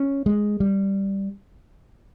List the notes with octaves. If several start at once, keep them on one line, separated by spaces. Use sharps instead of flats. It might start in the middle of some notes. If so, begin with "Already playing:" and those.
Already playing: C#4
G#3
G3